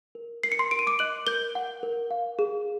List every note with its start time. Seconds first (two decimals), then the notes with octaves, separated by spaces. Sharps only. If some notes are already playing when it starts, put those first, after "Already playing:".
0.15 A#4
0.43 A#4 C7
0.52 C#7
0.59 C6 C7
0.71 A#4 D7
0.79 D#7
0.87 D6 D7
0.99 D#5 F#6 F#7
1.27 A#4 G6 G7
1.55 F#5
1.83 A#4
2.11 F5
2.39 G#4